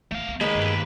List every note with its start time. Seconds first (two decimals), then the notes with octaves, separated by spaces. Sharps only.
0.11 A1 E3 A3 F5
0.28 D2
0.41 D#3 G#3 A#3 B4 B5
0.55 G2 B3